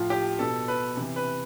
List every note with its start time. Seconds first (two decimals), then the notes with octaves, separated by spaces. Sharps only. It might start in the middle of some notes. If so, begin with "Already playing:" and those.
Already playing: A2 F3 F4
0.10 G4
0.39 B2 A4
0.68 B4
0.97 C3 E3
1.16 B4